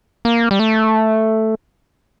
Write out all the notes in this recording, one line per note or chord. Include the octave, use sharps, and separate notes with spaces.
A#3
G3
A3